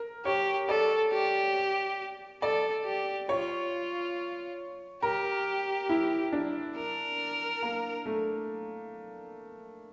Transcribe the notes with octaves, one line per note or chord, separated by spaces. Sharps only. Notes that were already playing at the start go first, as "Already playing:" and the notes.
Already playing: A#4
G4 C#5
A4 D5
G4
A4 D5
G4
F4 C#5
G4 A#4
E4
D4
A#4
A#3
A3